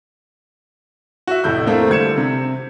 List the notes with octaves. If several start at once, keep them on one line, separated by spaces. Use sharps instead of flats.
F#4 E5
F1 A2 A3 E4 G6
A3 A#3 C4 E4 F4
D3 G3 G#6 C#7 E7
C3